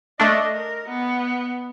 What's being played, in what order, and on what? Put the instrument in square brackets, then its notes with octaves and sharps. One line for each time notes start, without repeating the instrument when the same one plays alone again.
[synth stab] A3 D4 [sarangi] D#5
[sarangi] A#4
B3